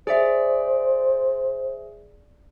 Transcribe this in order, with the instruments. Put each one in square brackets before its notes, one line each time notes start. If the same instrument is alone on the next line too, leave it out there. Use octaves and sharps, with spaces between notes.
[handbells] G#4 E5 [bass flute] C5 [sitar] D5